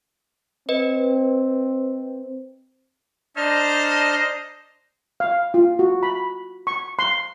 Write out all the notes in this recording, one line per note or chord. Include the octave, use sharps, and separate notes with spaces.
C4 B4 D#5
D4 D#4 C5 D#5 A5 F6
F5
F4
F#4
B5
C#6
C6